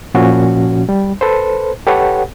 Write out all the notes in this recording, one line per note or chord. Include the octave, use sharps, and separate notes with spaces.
A#2 F3 C#4 F#4
G3
A4 B4 C5
G4 A4 B4 C#5 F#5